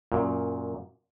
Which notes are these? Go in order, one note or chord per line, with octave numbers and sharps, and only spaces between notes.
F#2 A#2